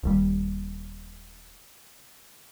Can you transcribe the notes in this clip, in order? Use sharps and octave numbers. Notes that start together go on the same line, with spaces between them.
D#1 D#2 G3